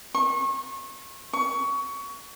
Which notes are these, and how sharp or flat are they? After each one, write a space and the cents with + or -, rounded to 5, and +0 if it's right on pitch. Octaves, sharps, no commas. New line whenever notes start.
C#6 -35
C#6 +20